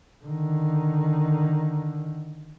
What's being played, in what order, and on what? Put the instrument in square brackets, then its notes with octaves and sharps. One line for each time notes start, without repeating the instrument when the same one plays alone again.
[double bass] D3 D#3